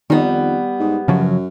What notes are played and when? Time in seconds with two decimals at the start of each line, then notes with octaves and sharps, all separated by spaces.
0.10 F2 D#3 G3 B3 D#4
0.79 G#2
1.08 F#2 C#3 F3 F#3